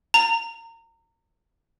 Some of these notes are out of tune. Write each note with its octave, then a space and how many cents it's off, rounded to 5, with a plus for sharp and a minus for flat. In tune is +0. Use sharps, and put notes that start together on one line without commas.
A#5 -30